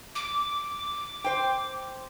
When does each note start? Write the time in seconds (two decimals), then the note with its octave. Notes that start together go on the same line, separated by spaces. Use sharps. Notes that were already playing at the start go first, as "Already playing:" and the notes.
0.15 D6
1.24 C5 G5